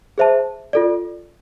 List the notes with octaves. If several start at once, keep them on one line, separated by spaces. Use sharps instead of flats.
G#4 C5 E5 A5
F4 A4 D5